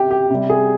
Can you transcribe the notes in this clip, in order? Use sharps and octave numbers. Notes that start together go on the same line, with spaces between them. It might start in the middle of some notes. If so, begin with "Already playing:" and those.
Already playing: C3 G4
G4
C3 G3
G#4